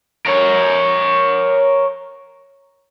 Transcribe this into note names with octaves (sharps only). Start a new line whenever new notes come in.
A#4 C#5